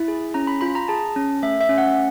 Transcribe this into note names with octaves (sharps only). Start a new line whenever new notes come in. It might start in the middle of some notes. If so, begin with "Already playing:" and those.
Already playing: E4 B5
G#4
C#4 A#5
B5
F4 B5
A#5
G#4 A5
C#4
A3 E5
E5
C#4
F#5